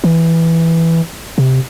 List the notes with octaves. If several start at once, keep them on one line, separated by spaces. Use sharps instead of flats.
E3
C3